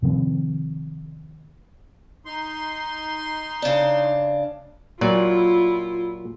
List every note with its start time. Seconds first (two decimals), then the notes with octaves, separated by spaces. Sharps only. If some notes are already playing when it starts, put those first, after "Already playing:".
0.02 C3 D#3 F3 C4
2.25 D#4 C6
3.62 C#3 D4
5.01 A#2 F#3 E4 F4 D5